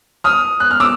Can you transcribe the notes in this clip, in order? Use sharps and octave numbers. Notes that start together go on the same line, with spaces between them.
D#6 F6
F#6
F6
D6 E6